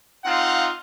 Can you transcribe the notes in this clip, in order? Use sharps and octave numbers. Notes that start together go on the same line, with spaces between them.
C4 D#4 F4 F5 F#5